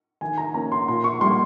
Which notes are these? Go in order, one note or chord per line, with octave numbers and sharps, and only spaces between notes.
D#3 G#5
A#5
A#3 C#4 A#5
C6
A#2 C6
C#6
G3 A#3 C6